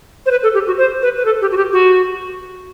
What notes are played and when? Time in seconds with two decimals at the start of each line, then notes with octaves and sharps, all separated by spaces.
0.26 C5
0.30 B4
0.43 A4
0.54 G4
0.66 F#4
0.78 C5
1.02 B4
1.16 B4
1.25 A4
1.41 G4
1.51 F#4
1.56 G4
1.72 F#4